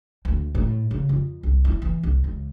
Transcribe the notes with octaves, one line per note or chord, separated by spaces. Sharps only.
D2
A2
C#3
F2
C2
E4
E3
C2
C#2